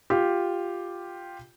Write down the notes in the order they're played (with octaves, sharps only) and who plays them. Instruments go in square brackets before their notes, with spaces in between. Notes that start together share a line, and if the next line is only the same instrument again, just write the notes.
[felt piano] F4 G4